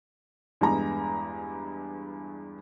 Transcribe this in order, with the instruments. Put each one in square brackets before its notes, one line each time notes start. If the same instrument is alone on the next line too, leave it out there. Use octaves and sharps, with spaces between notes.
[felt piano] E2 G2 G#3 A#5